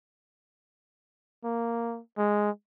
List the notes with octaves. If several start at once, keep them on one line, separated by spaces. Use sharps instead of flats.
A#3
G#3